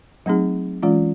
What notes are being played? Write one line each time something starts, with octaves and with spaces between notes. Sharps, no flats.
F#3 A3 C4 D#4 G#4
E3 G#3 C#4 F4